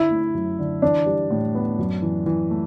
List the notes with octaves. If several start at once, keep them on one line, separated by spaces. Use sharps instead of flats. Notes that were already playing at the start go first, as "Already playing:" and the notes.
Already playing: D3 D4 E4
A3
F#2
D3
E3 D4
G3
A2
B3
F#2
E3
E3
A3